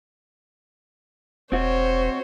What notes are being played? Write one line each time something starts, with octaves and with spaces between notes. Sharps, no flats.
E1 C4 F#4 C5 C#5